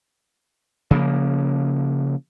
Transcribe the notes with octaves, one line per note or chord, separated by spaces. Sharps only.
C#3 F3 A#3